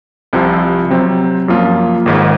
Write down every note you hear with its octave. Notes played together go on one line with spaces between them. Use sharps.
C2 C3 F3
C3 F#3 C4
F#2 F3 A#3 F4
G#1 G#2 D#3